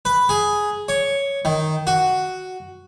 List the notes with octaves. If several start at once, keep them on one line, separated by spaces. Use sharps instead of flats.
B4
G#4
C#5
D#3
F#4